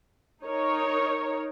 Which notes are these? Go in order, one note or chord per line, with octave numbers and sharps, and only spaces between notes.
D#4 A#4 C#5